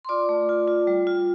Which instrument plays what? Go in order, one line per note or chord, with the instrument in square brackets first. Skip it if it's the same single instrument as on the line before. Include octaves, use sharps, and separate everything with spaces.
[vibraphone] C6
F4 D5 D6
A3
F4
F4
G3
F4